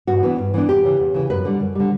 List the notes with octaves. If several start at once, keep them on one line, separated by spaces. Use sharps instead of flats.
G2 F#4
E3 B3 D4
G2
E3 B3 D4
E2 G4
C#3 E3
E2
C#3 E3
F#2 B4
D3 G3
F#2
D3 G3